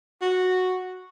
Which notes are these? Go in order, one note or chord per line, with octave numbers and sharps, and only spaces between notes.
F#4